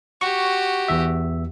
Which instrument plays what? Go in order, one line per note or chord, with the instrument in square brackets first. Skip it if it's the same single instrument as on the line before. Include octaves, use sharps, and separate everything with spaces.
[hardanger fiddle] F#4 G4 [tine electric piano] C#6
[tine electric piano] E2 E3 E5